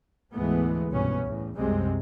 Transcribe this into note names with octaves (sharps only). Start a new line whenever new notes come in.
D2 G#2 E3 G#3 A3 B3
C2 G2 B2 B3 C#4
E2 A2
C2 F#2 C3 G3 G#3 C4